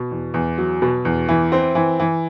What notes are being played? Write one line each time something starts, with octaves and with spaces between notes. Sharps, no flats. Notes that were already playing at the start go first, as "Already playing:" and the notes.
Already playing: B2
E2
E2
F#3
B2
E2
E3
C4
E3
E3